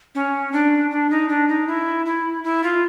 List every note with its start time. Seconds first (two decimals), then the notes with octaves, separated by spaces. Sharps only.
0.15 C#4
0.52 D4
0.91 D4
1.10 D#4
1.29 D4
1.48 D#4
1.67 E4
2.06 E4
2.44 E4
2.63 F4